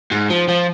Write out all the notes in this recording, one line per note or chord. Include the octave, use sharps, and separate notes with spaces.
G#2
F3
F3